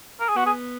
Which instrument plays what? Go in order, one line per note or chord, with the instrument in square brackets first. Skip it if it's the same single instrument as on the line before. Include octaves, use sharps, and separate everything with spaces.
[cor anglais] A#4
G#4
[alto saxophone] B3 [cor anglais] F#4
[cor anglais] G#4